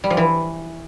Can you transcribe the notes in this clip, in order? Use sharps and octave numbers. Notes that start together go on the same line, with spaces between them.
G3
F3
E3